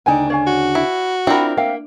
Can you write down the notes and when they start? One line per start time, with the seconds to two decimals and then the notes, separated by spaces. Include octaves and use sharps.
0.06 D2 C#3 D4 D#4 G5 G#5
0.30 C#5 F5 G#5
0.47 F#4
0.75 E4
1.27 C4 D4 E4 F4 A#4 G5 B5
1.57 A#3 E5 F5 G5